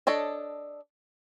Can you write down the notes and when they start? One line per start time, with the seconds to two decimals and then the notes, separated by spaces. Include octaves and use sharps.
0.07 D4 A4 C#5 D#5